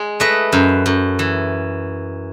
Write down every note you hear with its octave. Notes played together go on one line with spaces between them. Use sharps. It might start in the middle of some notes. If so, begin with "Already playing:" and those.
Already playing: G#3
A3 B4 D#5
F#2
F#2
E3